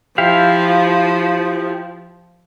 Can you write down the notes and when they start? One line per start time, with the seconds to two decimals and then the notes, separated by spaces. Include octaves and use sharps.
0.18 F3 E4 G4 F5